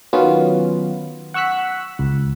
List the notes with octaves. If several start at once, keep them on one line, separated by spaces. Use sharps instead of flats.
D#3 F#3 B3 C#4 F4
F#5 C#6 E6 F#6 B6
C#2